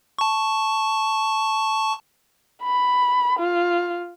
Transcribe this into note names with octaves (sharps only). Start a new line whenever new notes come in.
A5 C#6
B5
F4